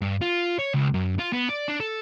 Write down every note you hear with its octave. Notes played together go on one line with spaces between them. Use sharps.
G2
F4
C#5
C#2
F#2
F4
B3
D5
D4
A4